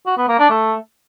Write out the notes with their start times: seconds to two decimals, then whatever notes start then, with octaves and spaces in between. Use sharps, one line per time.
0.07 F#4
0.17 B3
0.28 A#3
0.39 D4
0.50 A3